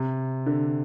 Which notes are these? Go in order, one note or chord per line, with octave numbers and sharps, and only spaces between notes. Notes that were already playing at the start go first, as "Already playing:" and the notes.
Already playing: C3
D3